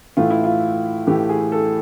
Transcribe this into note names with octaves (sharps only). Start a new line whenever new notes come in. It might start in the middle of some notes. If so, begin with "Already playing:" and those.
A2 E3 A3 F4
E4
F4
A2 E3 A3 G4
G#4
A4